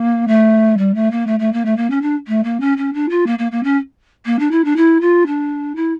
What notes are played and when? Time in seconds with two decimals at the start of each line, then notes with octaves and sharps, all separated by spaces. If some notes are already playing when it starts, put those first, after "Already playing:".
Already playing: A#3
0.27 A3
0.77 G3
0.94 A3
1.11 A#3
1.27 A3
1.39 A3
1.53 A#3
1.65 A3
1.77 A#3
1.90 C#4
2.02 D4
2.27 A3
2.44 A#3
2.60 C#4
2.77 C#4
2.93 D4
3.09 F4
3.26 A#3
3.38 A#3
3.51 A#3
3.63 C#4
4.26 A#3
4.39 D4
4.51 E4
4.64 D4
4.76 E4
5.01 F4
5.26 D4
5.75 E4